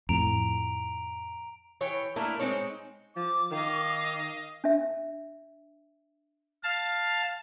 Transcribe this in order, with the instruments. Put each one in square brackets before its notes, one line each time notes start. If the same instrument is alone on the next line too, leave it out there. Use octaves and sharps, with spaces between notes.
[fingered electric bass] F2 A2 [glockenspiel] A#5 D7 F7
[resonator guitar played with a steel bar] E3 C#5 G5
A3 A#3 D4 E4 A#4
G#3 C4 D#4 C#5
[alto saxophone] F3 [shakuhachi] D6
[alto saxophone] D#3 [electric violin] D#5 F5
[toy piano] D4 E5
[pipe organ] F5 A5